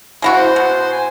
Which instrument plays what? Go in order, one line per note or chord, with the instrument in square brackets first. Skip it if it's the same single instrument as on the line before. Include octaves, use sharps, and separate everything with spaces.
[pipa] G#3 E4 F#4
[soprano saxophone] C5
[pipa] B2
[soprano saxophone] G#5